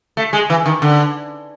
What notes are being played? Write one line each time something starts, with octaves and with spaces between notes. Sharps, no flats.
A3
G#3
E3
D#3
D3